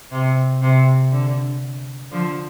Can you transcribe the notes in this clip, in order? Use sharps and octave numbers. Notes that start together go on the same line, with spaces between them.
C3
C3
D3
D3 F3